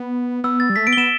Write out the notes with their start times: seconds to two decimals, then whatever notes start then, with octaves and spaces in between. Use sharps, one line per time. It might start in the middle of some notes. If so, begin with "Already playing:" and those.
Already playing: B3
0.44 B3 E6
0.60 A6
0.69 G3
0.76 A3 B6
0.87 B3 D7
0.93 G7
0.97 B3 E7